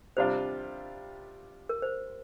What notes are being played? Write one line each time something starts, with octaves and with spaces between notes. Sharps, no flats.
C3 G3 D4 F4 C5
A#4
C5